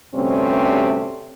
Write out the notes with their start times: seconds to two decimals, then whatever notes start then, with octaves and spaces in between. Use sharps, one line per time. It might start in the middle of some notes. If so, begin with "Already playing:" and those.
0.15 D2 G2 C3 A3 C4 C#4